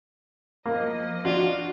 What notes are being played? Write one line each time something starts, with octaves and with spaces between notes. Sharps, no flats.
F3 A#3 D#5
D4 F4 F#4